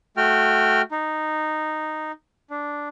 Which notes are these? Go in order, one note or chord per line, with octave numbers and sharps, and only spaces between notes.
A3 F#4 G5 F6
D#4
D4